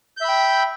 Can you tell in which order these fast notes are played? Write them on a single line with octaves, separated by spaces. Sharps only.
G6 E5 B5 G5